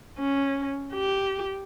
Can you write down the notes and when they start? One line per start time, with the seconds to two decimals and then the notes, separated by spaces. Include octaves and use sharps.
0.18 C#4
0.94 G4